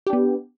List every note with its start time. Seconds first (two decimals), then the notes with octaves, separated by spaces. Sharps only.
0.07 G4
0.10 D4
0.13 B3